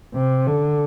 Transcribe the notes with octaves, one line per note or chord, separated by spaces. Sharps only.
C3
D3